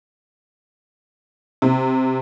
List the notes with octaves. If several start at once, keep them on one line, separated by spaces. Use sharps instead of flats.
C3